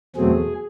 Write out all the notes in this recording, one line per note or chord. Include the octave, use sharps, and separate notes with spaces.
E2 B2 F#3 A3 C4 G#4